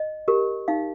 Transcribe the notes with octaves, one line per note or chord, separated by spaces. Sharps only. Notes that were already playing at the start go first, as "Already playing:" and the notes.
Already playing: D#5
G4 A#4
D#4 F5